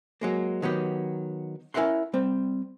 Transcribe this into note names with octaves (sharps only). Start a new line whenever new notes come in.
F#3 G#3 A#3
D#3 F#3 B3 G4
C#4 E4 A#4 E5 F#5 C6
G3 C4